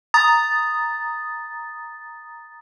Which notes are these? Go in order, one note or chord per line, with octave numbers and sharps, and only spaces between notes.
A#5 D#6 A6